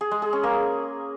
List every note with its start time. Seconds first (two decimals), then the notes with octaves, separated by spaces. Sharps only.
0.01 G#4
0.11 G#3
0.22 G#4
0.33 C#4
0.43 A#3